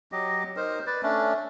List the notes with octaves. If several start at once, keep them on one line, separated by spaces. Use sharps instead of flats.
F#3 G4 D#5
D#4 A#4 C5
B4 D5
A3 C#4 D4